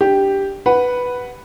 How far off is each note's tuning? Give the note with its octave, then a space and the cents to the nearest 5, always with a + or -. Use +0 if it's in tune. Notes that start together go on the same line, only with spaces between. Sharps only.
D4 +0 G4 +0
B4 +0 F#5 +0